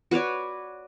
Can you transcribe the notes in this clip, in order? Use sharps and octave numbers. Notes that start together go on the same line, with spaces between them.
F#4 B4 C#5 D5